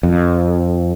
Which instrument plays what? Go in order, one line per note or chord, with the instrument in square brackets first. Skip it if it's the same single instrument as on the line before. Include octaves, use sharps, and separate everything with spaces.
[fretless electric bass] F2